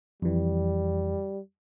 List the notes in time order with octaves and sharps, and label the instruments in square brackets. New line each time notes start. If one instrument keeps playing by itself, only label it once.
[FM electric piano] F2 E3 [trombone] G3